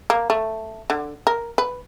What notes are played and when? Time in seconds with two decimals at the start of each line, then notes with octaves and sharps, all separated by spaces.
0.10 A#3
0.30 A3
0.90 D3
1.27 A#4
1.58 B4